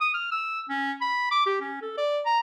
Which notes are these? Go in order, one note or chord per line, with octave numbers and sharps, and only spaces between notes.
D#6
F6
E6
C#4
B5
D6
G4
C#4
A4
D5
A#5